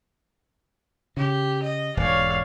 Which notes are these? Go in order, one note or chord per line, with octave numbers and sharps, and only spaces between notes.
C#3 G4
D#5
E1 G#2 C#5 D5 F5